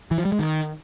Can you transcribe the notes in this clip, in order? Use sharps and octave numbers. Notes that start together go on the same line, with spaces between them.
E3
F3
G3
G#3
D#3